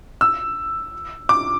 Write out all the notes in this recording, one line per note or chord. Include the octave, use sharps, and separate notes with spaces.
E6
D6